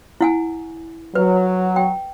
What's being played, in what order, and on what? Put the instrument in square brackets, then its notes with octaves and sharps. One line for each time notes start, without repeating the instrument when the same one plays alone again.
[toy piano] E4 F#5 G#5
[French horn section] F#3 [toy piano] B4
[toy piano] G5